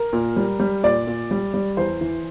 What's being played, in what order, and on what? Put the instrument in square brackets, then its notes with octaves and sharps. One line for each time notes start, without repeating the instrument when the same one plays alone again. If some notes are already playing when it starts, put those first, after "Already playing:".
Already playing: [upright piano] A#4
A#2
G3
G3
A#2 D5
A#2
G3
G3
E2 C5
E3